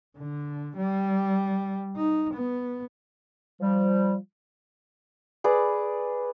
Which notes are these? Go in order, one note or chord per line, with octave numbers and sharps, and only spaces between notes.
D3
G3
D#4
B3
F3 G3
G#4 B4 D5